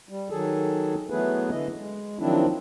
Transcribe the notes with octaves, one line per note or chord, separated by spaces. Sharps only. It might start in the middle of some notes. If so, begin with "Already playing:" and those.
G3
D#3 F#3 G#4 A4
E3 F#3 A3 B3 G#4 B4
D3 E3 E4 D#5
G#3
D#3 F3 F#3 C4 D4 E4